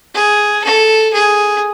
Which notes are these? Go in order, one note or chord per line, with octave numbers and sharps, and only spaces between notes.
G#4
A4
G#4